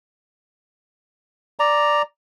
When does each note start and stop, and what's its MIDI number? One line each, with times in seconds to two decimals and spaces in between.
1.59 2.02 74
1.59 2.02 82